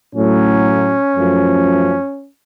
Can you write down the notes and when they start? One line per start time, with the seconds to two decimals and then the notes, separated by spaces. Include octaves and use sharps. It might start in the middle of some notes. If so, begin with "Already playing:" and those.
0.14 A2 F#3 A3 C#4
1.16 F#2 F3 A3